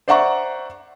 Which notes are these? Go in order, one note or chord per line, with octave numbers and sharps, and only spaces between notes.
C5 D5 E5 F#5 A#5 C#6